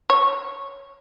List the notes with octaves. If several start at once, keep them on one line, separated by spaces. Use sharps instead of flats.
C#5